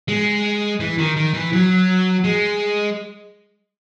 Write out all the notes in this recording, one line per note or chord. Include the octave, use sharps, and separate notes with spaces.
G#3
E3
D#3
D#3
E3
F#3
G#3